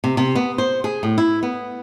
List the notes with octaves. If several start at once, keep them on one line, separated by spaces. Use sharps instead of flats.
C3
C3
B3
C5
G#4
A2
E4
B3